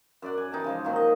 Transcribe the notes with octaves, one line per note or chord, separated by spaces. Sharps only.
F#2 D5 F#5
G#5
E3 D#4 G4 A5
C#3 F3 G#3
A#2 D#3 F3 F#3
D#5